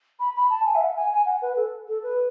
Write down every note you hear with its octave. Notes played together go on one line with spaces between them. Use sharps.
B5
B5
A5
G#5
E5
F#5
G#5
G#5
F#5
B4
A4
A4
B4